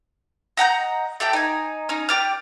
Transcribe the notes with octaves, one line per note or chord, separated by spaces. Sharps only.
D#5 F#5 A#5 G6
A3 G4 G5
D#4 G#5
C#4 D#4
G4 D5 F6